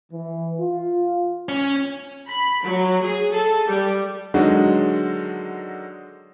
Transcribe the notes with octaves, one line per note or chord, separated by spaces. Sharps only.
E3
F4
C#4
B5
F#3
G#4
A4
G3
D3 D#3 F#3 G#3 D#4 F#4